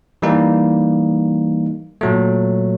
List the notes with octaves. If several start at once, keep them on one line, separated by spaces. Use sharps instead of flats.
E3 G3 A#3 D#4
A#2 F#3 A3